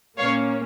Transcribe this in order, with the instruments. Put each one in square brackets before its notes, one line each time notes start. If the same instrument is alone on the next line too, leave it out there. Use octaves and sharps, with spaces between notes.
[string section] A#2 A#3 C#4 C#5 F5